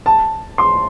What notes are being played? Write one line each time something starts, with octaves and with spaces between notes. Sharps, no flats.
A5
C6